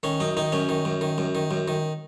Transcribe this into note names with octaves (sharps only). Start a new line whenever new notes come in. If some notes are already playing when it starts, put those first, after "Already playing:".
D#3 C#4
F#2 D#4
D#3 D#4
F#2 C#4
D#3
F#2
D#3
F#2
D#3
F#2
D#3